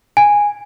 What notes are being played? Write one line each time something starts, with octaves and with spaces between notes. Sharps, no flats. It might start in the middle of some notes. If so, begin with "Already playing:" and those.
G#5